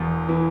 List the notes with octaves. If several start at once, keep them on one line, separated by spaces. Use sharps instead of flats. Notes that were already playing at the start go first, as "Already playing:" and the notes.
Already playing: E1 E2
E3